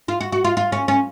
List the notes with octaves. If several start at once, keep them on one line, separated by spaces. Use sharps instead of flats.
F4
F#4
F#4
F4
F4
C#4
C#4